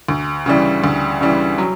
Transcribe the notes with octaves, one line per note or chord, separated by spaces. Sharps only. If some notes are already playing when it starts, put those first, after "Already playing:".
D2
C#3 E3 G3
D2
C#3 E3 G3
F#3